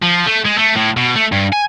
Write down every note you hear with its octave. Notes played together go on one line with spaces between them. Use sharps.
F3
A3
G#3
A3
A2
B2
A3
G2
G#5